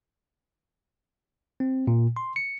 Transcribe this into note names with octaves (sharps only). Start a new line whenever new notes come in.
C4
A#2
C6
C#7